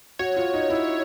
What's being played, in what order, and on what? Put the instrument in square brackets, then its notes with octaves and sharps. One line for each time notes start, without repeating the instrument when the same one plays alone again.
[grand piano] F#4 [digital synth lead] C#5
[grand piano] F4
D#4
E4